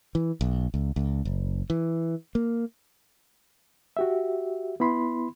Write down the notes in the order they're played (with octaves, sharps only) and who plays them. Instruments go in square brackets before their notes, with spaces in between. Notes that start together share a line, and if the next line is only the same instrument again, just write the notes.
[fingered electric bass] E3
B1
C#2
C#2
F#1
E3
A#3
[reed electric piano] F#4 G4 E5
B3 E4 B5 C6